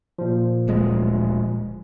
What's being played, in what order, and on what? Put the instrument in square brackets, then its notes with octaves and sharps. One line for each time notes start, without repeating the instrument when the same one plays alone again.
[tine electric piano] A#2 F3
[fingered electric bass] D1 G#3